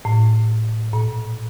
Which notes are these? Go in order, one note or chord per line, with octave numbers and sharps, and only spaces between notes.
A2
A#2